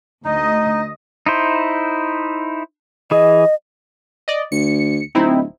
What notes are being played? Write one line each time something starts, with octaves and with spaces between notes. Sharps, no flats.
D2 D#4 D#5
D#4 E4 C5
E3 G#4 D#5
D5 D#5
D2 C#7
D1 C4 D#4 E4